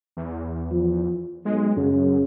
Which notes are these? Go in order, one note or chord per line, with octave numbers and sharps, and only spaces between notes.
E2
F3
B1 G#3
F#2 C#3